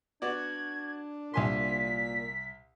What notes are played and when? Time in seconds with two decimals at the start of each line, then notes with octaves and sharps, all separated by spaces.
0.22 B3 D4 F#4 D5 G#6
1.34 C2 A#2 G#5 C6 B6